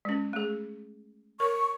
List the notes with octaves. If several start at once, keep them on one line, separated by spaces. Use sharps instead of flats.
G#3 C#4
A3 G#4
A#4 C#5 C#6